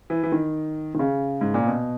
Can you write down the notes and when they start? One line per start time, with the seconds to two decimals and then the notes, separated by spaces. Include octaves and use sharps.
0.10 E3
0.23 E3
0.32 D#3
0.94 D#3
0.99 C#3
1.41 G#2
1.54 A#2
1.67 B2